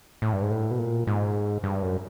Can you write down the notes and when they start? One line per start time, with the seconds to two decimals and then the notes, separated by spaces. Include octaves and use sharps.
0.22 A2
0.33 G2
0.42 G#2
0.50 A2
0.71 B2
0.78 A#2
1.07 G#2
1.64 G2
1.82 F#2